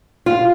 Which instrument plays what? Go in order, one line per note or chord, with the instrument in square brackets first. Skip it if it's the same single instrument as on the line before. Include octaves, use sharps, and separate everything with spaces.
[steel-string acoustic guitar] F4